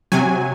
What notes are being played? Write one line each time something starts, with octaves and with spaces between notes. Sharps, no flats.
C3 F#3 G#5